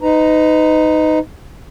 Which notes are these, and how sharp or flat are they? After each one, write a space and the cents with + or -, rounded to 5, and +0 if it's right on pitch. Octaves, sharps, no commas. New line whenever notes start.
D#4 +0 B4 +35 A#5 +0